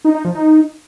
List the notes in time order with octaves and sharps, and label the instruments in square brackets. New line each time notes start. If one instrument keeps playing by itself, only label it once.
[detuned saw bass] D#4
D#4
F3
D#4